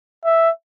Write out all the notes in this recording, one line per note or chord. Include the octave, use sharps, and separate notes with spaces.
E5